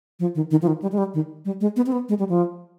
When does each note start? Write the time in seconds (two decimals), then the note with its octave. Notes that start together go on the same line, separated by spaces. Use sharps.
0.20 F3
0.35 D#3
0.51 D#3
0.62 F3
0.67 D#3
0.82 G3
0.92 G#3
0.98 G3
1.14 D#3
1.45 G3
1.61 G#3
1.76 B3
1.86 C4
1.92 B3
2.09 G#3
2.19 G3
2.29 F3